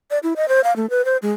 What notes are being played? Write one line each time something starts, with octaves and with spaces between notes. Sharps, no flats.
D5
E4
D#5
C5
F5
A3
B4
C5
G#3